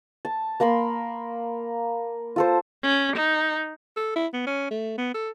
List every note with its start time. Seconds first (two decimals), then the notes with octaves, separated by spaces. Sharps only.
0.25 A5
0.60 A#3 A#4 B5 C6
2.36 F4 A4 C5
2.83 C#4
3.16 D#4
3.97 A4
4.16 E4
4.34 B3
4.47 C#4
4.71 A3
4.98 B3
5.15 A4